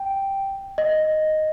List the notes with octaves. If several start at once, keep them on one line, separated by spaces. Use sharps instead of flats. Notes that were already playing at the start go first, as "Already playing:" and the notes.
Already playing: G5
D#5